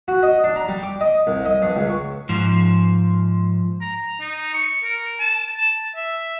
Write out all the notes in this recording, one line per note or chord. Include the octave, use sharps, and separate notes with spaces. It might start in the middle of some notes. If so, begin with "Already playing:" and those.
F#4
D#5
D4
A#5
G3
D6
D#5
C2
D#5
G2
C#2
C#6
G#2 F3
A#5
D#4
C#6
A#4
A5
E5